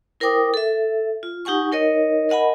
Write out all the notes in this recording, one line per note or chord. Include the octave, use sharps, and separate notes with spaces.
E4 A#4 C5 G5 D6 D#6
A4 E5
F4
D#4 G4 F#5 G#5 C#6
D#4 A#4 C#5 D#5
A#4 D#5 F#5 G#5 B5